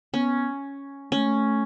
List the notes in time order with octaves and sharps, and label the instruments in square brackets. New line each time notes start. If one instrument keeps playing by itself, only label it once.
[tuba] B3 [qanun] C#4
[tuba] A3 [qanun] C#4